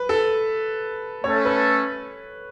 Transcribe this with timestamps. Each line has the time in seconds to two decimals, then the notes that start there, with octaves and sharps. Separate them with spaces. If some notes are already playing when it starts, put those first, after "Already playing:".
Already playing: B4
0.09 A4
1.24 A3 C#4 A4 C#5
1.45 B4